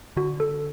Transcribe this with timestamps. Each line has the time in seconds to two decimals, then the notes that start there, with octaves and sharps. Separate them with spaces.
0.17 D3 F#4
0.40 A4